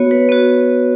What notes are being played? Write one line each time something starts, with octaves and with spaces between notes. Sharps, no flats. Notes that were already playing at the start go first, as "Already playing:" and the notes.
Already playing: B3 F#4 C#5
B4
B3 F#4